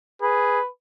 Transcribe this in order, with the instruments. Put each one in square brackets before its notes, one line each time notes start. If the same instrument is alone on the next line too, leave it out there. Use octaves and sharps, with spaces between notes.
[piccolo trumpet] G#4 [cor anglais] B4